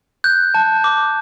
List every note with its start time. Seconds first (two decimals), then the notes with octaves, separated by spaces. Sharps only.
0.24 F#6 G6
0.54 A5
0.84 D6